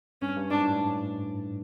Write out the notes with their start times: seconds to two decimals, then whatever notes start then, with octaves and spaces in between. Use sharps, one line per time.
0.22 G2 C#4
0.36 G2
0.51 G#2 D4
0.66 A2